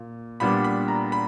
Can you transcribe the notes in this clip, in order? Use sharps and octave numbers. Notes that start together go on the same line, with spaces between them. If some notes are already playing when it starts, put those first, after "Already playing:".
Already playing: A#2
A#2 G3 B3 D4 B5
B5
A#5
B5